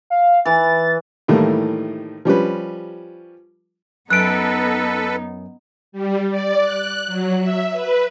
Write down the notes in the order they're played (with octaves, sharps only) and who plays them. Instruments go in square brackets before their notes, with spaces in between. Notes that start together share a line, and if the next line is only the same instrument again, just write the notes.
[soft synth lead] F5
[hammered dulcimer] E3 [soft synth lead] A6
[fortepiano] A2 D#3 E3 G3 A3 A#3
F3 G3 C#4 B4
[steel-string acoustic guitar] F#2 [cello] B3 D#4 [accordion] A4 B4 [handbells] F#6 D7
[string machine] G3
D5
F#6
F#3
E5
B4